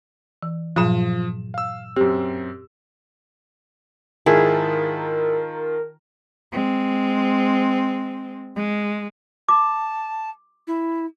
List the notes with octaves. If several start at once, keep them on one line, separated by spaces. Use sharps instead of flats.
E3
G2 A#2 F3 F#3 D#6 E7
F5 E6
F#2 C4 G4
G#2 D#3 E4 F4 G#4 A#4 A5
G#3 C4
G#3
A5 D6
E4